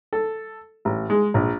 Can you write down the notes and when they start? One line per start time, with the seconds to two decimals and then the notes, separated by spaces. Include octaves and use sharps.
0.13 A4
0.85 A1
1.10 G#3
1.34 A#1